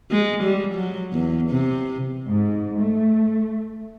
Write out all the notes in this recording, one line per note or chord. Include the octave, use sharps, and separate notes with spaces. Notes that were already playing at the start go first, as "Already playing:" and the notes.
G#3
G3
F#3
E2
C3
G#2
A3